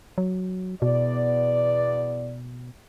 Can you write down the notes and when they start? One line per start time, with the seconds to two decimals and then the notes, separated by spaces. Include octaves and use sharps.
0.18 F#3
0.82 E2 B2 B3 D5